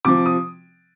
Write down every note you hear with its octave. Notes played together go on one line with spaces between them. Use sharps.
C3 F3 D6
D#6